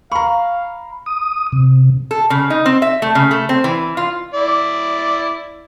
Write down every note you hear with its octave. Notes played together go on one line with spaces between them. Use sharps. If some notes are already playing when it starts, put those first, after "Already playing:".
F5 A#5 B5 C#6
D#6
C3
A4
C#3
D#4
C4
E5
A3
C#3
A3
C4
E3
F4
E4 D5